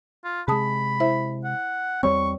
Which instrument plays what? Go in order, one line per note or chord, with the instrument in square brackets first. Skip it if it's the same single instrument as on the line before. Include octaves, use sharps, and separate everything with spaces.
[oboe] F4
[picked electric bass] C3 G#3 [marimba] G#4 A5 D#6 [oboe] B5
[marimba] E4 C5 E5
[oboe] F#5
[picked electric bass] E2 G3 C4 [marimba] C#5 [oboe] C#6